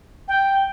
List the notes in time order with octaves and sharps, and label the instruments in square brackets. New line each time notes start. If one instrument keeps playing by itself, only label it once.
[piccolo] G5